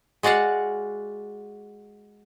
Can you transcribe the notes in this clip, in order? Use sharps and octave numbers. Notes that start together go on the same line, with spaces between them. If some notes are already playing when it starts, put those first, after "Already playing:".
G#3 F#4 D5 F5 F#5